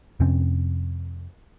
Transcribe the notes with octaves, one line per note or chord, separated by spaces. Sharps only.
F2 C3 C4 C#4